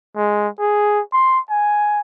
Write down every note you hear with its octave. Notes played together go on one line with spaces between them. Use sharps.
G#3
G#4
C6
G#5